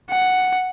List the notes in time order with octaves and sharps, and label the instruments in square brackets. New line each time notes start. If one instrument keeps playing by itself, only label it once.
[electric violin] F#5